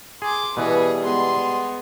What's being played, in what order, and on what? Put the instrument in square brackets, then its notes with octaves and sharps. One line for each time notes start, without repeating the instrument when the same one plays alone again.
[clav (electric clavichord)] G#4 [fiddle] C6 D6
[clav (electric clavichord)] B2 E3 [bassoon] G3 [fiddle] B3 G#4
[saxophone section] G#3 B3 [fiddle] C6